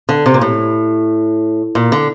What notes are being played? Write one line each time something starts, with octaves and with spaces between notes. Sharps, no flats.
D3
C3
A#2
A2
A#2
D3